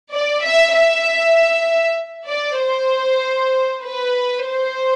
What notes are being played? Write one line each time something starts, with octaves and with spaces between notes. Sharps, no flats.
D5
E5
E5
D5
C5
B4
C5